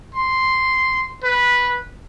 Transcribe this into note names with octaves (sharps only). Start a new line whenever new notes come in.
C6
B4